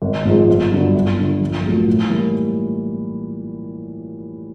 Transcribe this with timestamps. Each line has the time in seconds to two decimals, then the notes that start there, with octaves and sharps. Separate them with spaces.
0.02 G#1
0.25 G#2 F3 G#3
0.48 G1
0.71 G2 D3 F#3
0.94 G1
1.18 G2 D3
1.41 A#1
1.64 A#2 F#3 A3
1.87 A2
2.10 E3 G3 A#3